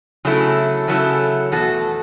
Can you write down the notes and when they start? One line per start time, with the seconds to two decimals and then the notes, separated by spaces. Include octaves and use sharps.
0.25 C#3 F#3 A3 E4 A4
0.88 C#3 F#3 A3 E4 A4
1.52 E2 B2 A3 F#4 A4